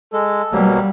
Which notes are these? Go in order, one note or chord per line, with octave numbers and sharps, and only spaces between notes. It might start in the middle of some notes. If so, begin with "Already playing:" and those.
G#3 A4
B2 F#3 G3 A#3